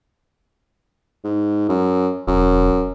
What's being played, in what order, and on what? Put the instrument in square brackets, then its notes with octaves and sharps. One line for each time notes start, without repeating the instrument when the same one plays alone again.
[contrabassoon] G#2
F#2
[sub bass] E1 [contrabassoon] F#2